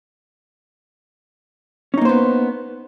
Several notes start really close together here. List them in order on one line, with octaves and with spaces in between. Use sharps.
C#4 D#4 A#3 C5 B3